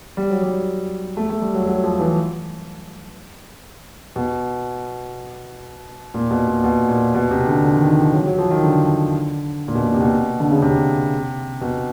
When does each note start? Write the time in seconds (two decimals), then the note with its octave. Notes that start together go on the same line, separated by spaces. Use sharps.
0.17 G3
0.30 F#3
0.43 G3
1.17 A3
1.30 A3
1.42 G3
1.54 F#3
1.67 F#3
1.84 F3
2.00 E3
4.16 B2
6.14 A#2
6.31 B2
6.48 A#2
6.64 B2
6.89 A#2
7.15 B2
7.31 C3
7.47 D3
7.64 D3
7.76 D#3
7.89 D#3
8.01 F3
8.13 F#3
8.26 F#3
8.39 F3
8.50 D#3
8.64 D3
9.68 A#2
9.75 B2
9.87 A#2
9.94 C3
10.00 B2
10.40 D3
10.51 C#3
10.62 C3
11.61 B2